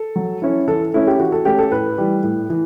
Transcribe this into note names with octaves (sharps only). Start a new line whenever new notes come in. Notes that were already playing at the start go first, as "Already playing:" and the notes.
Already playing: A4
F#3
C#4 E4
E3 A4
A3 C#4 E4
G4
E3 F#4
A4
A3 C#4 G4
A4
A2 B4
E3 G3
A2
E3